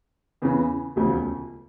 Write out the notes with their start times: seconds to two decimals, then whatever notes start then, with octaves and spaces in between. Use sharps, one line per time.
0.42 E2 C#3 E3
0.96 E1 D2 C#3 F3